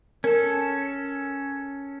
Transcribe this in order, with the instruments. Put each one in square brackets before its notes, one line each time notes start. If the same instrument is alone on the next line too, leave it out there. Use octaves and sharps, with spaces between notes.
[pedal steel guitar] C#4 A4 [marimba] A#4